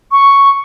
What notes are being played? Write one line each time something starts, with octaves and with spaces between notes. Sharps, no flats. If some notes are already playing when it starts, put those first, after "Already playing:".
C#6